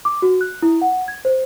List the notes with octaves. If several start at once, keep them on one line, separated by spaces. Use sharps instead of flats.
D6
F#4
F#6
E4
F#5
G#6
C5